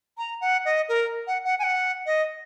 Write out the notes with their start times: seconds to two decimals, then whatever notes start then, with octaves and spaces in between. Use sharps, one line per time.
0.18 A#5
0.41 F#5
0.65 D#5
0.89 A#4
1.27 F#5
1.44 F#5
1.59 G#5
1.63 F#5
2.06 D#5